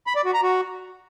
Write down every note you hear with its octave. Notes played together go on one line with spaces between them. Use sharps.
B5
D5
F#4
A#5
F#4